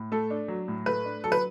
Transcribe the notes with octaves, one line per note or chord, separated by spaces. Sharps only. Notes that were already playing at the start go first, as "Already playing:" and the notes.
Already playing: A2
A3 A4
D4
F#3
A2
A3 B4
D4
F#3 A4
B4